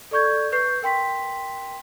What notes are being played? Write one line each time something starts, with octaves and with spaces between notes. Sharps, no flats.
A4 D5 C#6 G6 G#6
B4 C#6 G6 C7
A#4 G5 C6 B6